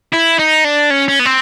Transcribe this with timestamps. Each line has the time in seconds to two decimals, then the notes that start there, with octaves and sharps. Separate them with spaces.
0.13 E4
0.39 D#4
0.64 D4
0.90 C#4
1.08 C#4
1.19 B3
1.25 C4